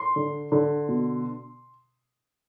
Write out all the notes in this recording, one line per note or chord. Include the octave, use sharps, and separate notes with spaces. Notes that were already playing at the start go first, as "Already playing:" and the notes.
Already playing: C6
D3
D3
B2